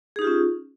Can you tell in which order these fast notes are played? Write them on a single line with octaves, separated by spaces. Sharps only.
G#4 D#4 G4 F4 C#4